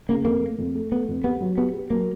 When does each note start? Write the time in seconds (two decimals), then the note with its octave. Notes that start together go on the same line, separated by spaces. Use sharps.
0.09 C#3 A#3
0.25 F2 A#3
0.42 A3
0.58 F2
0.75 A3
0.91 A3 B3
1.08 F2
1.24 B3 G4
1.41 F#3
1.58 B3 G4
1.74 G4
1.90 F#3 A#3